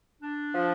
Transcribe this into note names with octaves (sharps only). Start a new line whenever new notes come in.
D4
F3